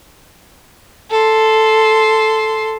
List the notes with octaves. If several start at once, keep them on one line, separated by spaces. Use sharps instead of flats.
A4 C6